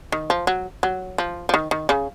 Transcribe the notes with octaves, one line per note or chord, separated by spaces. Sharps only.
D#3
F3
F#3
F#3
F3
F3
D#3
D#3
C#3